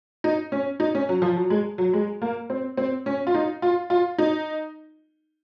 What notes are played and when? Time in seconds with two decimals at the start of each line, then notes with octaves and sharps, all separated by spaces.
0.24 D#4
0.52 C#4
0.80 D#4
0.95 C#4
1.09 F#3
1.22 F3
1.37 F#3
1.50 G#3
1.78 F#3
1.93 G#3
2.22 A#3
2.50 C4
2.77 C4
3.06 C#4
3.27 F4
3.34 D#4
3.62 F4
3.90 F4
4.18 D#4